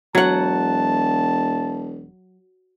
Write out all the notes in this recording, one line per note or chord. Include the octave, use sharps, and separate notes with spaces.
E1 F#3 F#5 A5